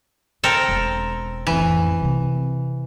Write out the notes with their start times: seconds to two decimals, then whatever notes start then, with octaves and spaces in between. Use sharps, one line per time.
0.43 D3 C4 A4 A#4
0.68 E1
1.47 A1 F2 E3
2.02 C3 C4